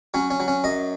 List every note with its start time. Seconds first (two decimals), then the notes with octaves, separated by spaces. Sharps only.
0.14 F#3 C#4
0.30 C#4
0.40 F#3
0.48 C#4
0.64 F#2 D#5